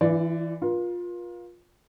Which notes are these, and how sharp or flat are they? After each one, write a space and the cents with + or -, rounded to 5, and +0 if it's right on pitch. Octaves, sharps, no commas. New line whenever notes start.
E3 +0 F4 -45 D5 +0
F4 +15 A#4 +45